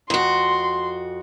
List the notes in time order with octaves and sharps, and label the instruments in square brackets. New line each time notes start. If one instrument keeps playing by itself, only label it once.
[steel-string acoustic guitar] F2 F#4 [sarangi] C6